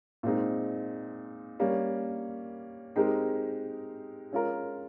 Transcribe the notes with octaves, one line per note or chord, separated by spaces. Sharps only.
A#2 G#3 C4 D#4
G3 A#3 C#4
G#3 C4 D#4 G4 A#4
G#3 C#4 F4 A#4